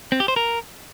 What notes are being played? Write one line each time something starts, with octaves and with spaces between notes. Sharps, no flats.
C4
G4
C5
A#4